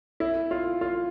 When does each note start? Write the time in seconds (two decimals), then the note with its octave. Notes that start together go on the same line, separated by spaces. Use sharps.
0.20 E4
0.51 F4
0.81 F4